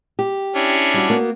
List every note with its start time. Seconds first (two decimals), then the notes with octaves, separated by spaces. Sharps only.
0.19 G4
0.55 C#4 D4 E4
0.94 G3 F#4
1.10 A#3 B3 F#4